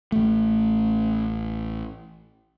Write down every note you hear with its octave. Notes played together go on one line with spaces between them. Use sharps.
A1 A3